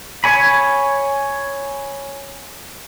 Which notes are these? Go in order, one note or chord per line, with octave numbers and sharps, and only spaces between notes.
C#5 G#5 B5